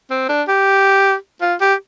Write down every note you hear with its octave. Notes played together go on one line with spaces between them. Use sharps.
C4
D4
G4
F4
G4